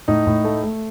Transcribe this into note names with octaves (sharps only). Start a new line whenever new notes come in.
A2 D#4
A2
A3
A3